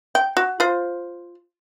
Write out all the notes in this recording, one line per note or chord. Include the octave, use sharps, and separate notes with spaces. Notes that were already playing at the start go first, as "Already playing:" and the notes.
G5
F#4
F4 C5